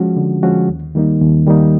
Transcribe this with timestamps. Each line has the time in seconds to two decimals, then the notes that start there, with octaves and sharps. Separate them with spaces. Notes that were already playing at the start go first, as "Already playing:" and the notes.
Already playing: F3 G#3 C#4 F#4
0.17 D3
0.43 F3 G#3 C#4 F#4
0.68 D#2
0.95 D#3 G3 A#3 D#4
1.21 D#2
1.47 D#3 G3 A#3 D#4